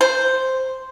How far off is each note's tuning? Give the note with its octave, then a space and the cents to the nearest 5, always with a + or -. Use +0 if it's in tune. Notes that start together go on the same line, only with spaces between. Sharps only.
C5 +0